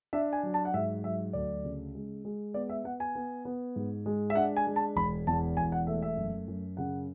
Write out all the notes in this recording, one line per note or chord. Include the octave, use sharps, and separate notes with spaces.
D4 E5
G#5
F#3
A5
F#5
G#2 E5
F#3 E5
D2 D5
C#3
G#3
G#3
B3 D5
E5
B3 F#5
G#5
B3
B3
G#2
G#3
E5
D4 F#5
G#5
G#3
A5
E1 B5
E2 A5
E1 G#5
F#5
A3 E5
E5
F#2
F#2
C#3 F#5